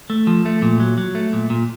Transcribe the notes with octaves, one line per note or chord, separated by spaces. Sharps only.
A3
F3
A3
A#2
F#3
F#3
A3
A#2
A#2